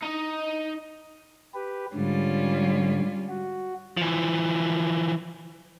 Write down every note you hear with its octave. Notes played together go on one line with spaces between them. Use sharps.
D#4 D#5
G4 B4
G#2 D3 G3 C#4 F4
F#4
E3 F3